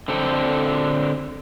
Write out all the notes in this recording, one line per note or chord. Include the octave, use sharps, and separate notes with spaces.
D3 C4 A4